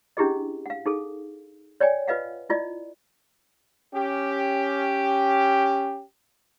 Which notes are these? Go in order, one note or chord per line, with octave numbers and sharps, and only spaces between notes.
C#4 D4 E4 G4 G#4 D#5
F5 F#5
D#4 G#4 A4
C#5 D5 G5 G#5
F4 B4 D#5 F5 F#5
E4 F4 D5 D#5
C#4 G4